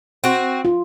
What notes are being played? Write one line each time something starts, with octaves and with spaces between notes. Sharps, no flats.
C4 F#4
F4